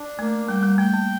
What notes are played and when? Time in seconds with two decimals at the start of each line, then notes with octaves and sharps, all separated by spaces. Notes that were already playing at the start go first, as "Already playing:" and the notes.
Already playing: D4
0.19 A3 A#3
0.48 G3 G5
0.63 G3
0.78 A3 G5
0.94 A#3